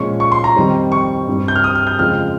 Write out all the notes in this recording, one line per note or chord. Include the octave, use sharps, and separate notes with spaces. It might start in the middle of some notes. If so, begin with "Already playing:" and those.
Already playing: A#2 F3 G#3 C#4 C#6
C#6
C6
A#5
F2 D#3 G3 C4
C#6
G2 G3 C4
G6
F6
D#6
F6
G6
F2 C#3 F3 G#3 C4 F6